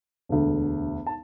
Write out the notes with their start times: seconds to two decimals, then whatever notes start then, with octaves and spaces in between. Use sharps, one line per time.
0.29 E1 D2 D3
1.07 A5